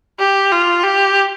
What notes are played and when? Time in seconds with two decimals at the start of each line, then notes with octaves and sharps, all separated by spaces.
0.19 G4
0.52 F4
0.83 G4